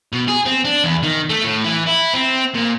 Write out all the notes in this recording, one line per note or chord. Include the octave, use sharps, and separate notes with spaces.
B2
G#4
C4
D4
E2
D#3
A3
A2
E3
E4
C4
A#2